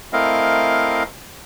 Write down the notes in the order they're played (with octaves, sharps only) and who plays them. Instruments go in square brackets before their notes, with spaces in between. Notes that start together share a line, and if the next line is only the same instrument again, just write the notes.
[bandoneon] A3 C4 E4 A#4 D#5 F5